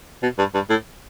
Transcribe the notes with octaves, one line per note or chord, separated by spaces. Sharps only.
B2
G2
G2
A2